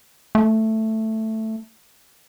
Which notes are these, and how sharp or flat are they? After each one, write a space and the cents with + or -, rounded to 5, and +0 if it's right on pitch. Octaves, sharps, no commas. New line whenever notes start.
A3 +5